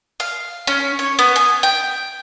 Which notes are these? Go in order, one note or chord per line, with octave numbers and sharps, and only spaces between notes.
F5
C#4
C#5
B3
G#5
G5